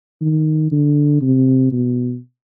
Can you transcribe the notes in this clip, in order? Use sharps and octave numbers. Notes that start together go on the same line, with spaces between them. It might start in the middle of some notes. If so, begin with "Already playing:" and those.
D#3
D3
C3
B2